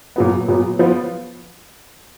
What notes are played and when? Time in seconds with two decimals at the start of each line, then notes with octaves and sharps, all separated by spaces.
0.16 A#2 F#3 B3
0.48 A#2 F#3 B3
0.79 F3 B3 F4